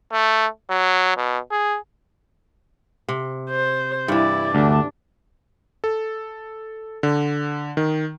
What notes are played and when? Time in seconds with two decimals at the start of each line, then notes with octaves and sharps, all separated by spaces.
0.12 A3
0.70 F#3
1.17 B2
1.51 G#4
3.08 C3
3.50 C5
4.08 G2 E3 E4 D5
4.55 D2 D4
5.84 A4
7.03 D3
7.77 D#3